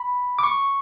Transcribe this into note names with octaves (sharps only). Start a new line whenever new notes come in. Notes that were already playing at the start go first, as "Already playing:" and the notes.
Already playing: B5
D6
C#6